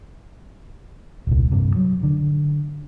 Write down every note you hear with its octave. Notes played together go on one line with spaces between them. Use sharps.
D#1 C2
G2 C3
F#3
D3